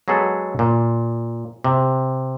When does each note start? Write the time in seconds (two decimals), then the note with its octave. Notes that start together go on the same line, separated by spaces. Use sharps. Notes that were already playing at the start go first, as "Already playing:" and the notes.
0.08 F#3 G#3 B3 G#4 A4 B4
0.59 A#2
1.64 C3